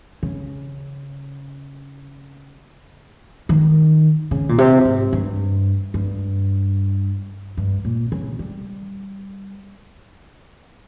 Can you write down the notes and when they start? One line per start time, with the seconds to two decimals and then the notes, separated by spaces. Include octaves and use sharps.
0.23 C#3
3.49 D#3
4.31 C#3
4.49 A#2
4.58 C3
4.85 G#2
5.13 G2
5.94 G2
7.57 G2
7.85 A#2
8.12 C#3
8.39 G3